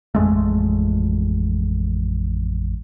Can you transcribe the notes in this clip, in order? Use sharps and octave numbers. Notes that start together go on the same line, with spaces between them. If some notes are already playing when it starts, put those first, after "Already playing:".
A1 F2 G#3 A3